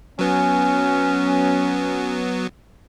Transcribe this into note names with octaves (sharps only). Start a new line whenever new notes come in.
F#3 B3 C#4